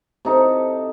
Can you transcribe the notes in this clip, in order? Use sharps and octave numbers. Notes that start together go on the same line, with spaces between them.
C3 D#4 A4